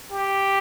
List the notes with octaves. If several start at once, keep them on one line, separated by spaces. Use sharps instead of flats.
G4